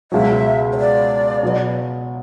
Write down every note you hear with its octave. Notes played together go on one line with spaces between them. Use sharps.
C#2 B2 F#3 E5
C#5
D5
B2 F#3 B3